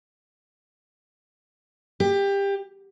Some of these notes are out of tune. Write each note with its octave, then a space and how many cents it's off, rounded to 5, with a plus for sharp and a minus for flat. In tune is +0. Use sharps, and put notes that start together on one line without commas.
G4 +20